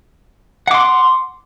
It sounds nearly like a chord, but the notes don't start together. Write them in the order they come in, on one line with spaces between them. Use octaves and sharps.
F#5 D6 C6